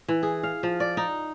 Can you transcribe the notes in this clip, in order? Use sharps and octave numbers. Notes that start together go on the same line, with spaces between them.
E3
G#4
F5
F3
D5
D#4